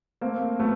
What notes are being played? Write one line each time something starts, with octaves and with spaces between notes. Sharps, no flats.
A3 A#3 C4
F#3 A3 B3